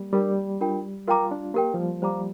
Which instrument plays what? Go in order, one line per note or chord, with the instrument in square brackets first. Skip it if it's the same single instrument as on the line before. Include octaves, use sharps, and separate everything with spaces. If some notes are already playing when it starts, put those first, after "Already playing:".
Already playing: [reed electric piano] G3 A#3
[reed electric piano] G3 [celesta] D4 A#4 D5 G5 D6
[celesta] D4 F4 A#4 G5
[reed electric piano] F4 [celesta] A#4 G5 A#5 D6
[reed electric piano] D4
[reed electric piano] A#3 [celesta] G4 A#4 G5
[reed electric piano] F3
G3
[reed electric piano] G3 [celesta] C5 F5 A#5 D6